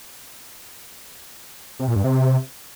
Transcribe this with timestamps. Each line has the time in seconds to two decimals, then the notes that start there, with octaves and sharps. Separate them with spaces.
1.79 C3
1.88 A#2
1.96 G2
2.04 C3